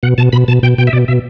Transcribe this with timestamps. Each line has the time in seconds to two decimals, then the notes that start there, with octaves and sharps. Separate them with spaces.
0.03 B2 F#5
0.18 B2 A5
0.32 B2 B5
0.48 B2 A5
0.63 B2 G5
0.78 B2 G5
0.87 E5
0.93 B2 D5
1.08 B2 E5